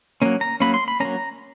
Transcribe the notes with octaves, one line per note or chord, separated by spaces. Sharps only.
F#3 A#3 C#4
A#5
F#3 A#3 C#4 B5
C6
B5
F#3 A#3 C#4 A#5